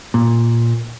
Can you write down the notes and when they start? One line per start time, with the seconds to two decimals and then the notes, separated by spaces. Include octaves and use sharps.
0.14 A#2